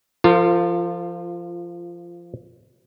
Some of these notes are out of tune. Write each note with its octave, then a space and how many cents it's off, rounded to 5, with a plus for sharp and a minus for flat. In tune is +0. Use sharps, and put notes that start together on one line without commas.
F3 -20 F4 +0 A4 +45